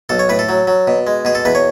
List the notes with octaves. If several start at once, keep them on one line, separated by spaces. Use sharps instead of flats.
B1 A4
C#5
A2 B4
A4
F#3
F#3
B2
G#3
B2 G#4
A4
E2 B4
C#5